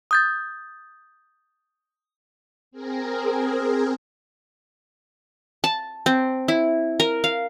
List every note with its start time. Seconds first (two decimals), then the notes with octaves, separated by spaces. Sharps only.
0.11 D#6 G6 A6
2.71 C4 G#4 A#4
5.64 A5
6.06 C4
6.48 E4
7.00 A#4
7.24 F5